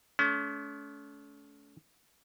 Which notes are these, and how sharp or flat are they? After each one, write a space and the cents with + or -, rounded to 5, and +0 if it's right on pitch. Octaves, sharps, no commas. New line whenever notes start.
A3 -30 C#4 +40